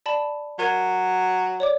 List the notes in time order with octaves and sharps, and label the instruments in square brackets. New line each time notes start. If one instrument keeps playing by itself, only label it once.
[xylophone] D5 A5 B5
[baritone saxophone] F#3 [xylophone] A#4 G#6 D#7
[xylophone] C#5 D5 D6